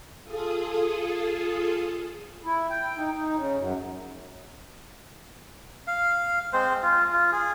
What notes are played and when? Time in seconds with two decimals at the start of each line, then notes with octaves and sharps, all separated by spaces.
0.24 F4 G#4 A4 D#6
2.45 E4
2.70 G5
2.97 D#4
3.12 D#4
3.36 C#3
3.57 F#2
5.87 F5
6.53 G#3 C4 C5
6.82 F4
7.13 F4
7.32 G#4